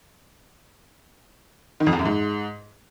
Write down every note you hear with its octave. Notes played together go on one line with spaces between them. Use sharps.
D#3
F2
E2
F#2
G#2